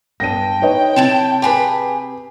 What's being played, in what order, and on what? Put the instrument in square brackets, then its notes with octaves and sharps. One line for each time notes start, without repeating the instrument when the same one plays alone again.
[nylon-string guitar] G2 B3 D4 [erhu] G5 [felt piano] A#6 D#7
[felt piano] D#4 B4 D#5 [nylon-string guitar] C#5
[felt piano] C3 [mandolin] E4 A5 G6
[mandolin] G4 G#4 B5 [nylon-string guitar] B4 A5